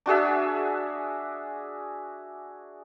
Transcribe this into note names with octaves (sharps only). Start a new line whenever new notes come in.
D4 F#4 G#4 E5